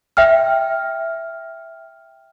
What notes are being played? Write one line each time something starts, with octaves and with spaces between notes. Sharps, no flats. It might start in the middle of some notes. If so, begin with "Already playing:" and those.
E5 G5 F6